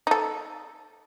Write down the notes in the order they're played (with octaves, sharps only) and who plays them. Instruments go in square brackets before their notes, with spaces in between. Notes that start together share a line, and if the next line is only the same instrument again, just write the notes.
[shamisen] D#4 A4